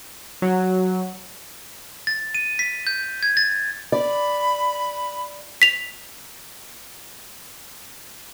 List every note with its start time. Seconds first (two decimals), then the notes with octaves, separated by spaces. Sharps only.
0.42 F#3
2.07 A6
2.35 D#7
2.59 B6
2.87 G6
3.23 G#6
3.37 A6
3.92 D5 B5
5.62 B6 F7